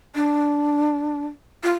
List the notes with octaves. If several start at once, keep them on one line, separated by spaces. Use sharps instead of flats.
D4
F4